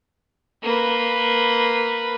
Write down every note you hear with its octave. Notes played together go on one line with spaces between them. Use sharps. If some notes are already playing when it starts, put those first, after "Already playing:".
A#3 B4